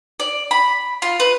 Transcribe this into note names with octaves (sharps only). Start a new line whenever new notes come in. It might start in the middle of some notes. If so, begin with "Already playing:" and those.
D5
B5
F4
B4